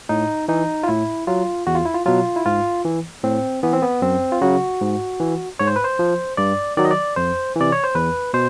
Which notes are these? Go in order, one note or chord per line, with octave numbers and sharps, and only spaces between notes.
A2 D#4
E3 D#4
F4
A2 E4
F#3 F4
E2 F#4
F4
E4
F4
B2 F#3 F4
E4
G#2 F4
E3
A2 C4
E3 B3
C4
B3
F#2 C4
F4
C#3 F#3 F#4
G#2
E3
G#2 C#5
C5
B4
C5
F3
G2 D5
D#3 F#3 D5
D#5
D5
F2 C5
C3 E3 D5
C#5
C5
E2 B4
B2 C5